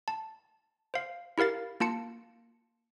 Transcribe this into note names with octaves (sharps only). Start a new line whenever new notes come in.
A5
C5 F5
E4 G4 A#4 F5 A6
A#3 F4 A5 C#7